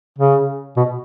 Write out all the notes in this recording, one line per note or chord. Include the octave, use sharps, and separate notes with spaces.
C#3
B2